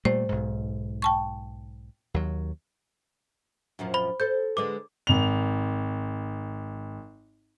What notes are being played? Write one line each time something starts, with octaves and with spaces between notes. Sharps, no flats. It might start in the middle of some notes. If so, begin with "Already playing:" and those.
A#2 G3 A3 C5
B1 G#2
G5 A5 C#6
D#2 F#3
F#2 A#2 F3
C5 B5
A4 C5 G6
D3 G#3 B4 D6
G#1 F7